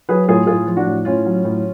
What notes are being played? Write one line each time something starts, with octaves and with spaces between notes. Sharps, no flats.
F#3 G#4 B4
A2 F4 G#4
A2 F4 G#4
F3 F4
D4 F#4
A2
A2 C#4 F4
F#3
A2